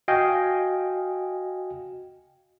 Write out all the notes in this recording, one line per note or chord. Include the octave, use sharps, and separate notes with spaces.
F#4 D#5 F5 G5 G#5